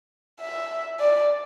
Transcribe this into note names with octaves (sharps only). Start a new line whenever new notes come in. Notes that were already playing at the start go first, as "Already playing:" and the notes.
E5
D5